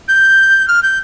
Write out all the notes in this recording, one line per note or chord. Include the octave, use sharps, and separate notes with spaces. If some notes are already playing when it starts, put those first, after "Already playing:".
G6
F6
G6